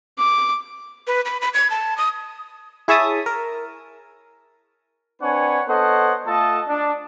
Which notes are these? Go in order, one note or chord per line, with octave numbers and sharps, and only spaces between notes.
D6
B4
B5
B5
G#6
A5
D#6
E4 G#4 C#5 E5 A5 D#6
A#4
C4 D4 B4 C#5 F#5 G#5
B3 A4 C5 C#5 D#5 F#5
A3 F4 A4 D#5 A5
D4